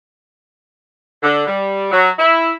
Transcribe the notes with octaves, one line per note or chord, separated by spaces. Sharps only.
D3
G3
F#3
E4